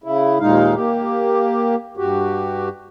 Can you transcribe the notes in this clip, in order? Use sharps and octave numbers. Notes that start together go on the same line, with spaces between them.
C#3 E4
D#2 A#2 G#3 D#4 F5
A#3 G4
G2 F#4 G4